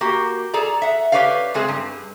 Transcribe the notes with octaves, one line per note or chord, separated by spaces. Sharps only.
A#3 F#4 G4
G#4 A4 D5 A#5
E5 F#5
G4 B4 C#5 D5 F5
C#3 G#3 A3 C4 G#4
G2